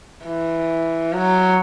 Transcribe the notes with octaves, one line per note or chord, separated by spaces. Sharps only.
E3
F#3